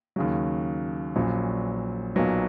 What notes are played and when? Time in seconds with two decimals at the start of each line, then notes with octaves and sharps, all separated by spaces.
0.16 D#2 C#3 F#3
1.15 A#1 A#2 F#3 C#4
2.15 B1 A#2 F#3 B3